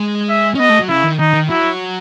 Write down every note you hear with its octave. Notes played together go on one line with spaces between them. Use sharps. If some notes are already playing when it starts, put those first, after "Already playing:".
Already playing: G#3
E5
C#4
B3 D#5
A3
F#3
C#3 E4
D#3
D#3 D#4
D#3
F#3 E4